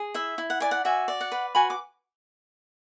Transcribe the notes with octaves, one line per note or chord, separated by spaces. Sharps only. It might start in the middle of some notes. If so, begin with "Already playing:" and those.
Already playing: G#4
E4 E5
E4
F#5
D5 G#5
F#5
F#4 E5 G#5
D5
F#5
B4
F#4 G#5 B5
D6